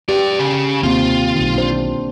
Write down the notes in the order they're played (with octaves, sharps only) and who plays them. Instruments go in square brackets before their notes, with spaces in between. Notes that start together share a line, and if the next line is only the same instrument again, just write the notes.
[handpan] G4 [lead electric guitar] B4 D5
[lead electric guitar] C#3
[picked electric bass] D#2 C3 [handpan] A#3 C4 [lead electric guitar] F4
[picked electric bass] B1 D#3
[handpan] D4 C5